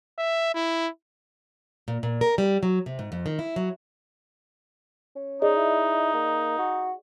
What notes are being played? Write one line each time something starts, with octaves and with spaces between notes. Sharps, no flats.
E5
E4
A#2
A#2
A#4
G3
F#3
C3
G#2
F2
D#3
E4
F#3
C#4
D#4 G#4 D5 D#5
E4
A#3
F#4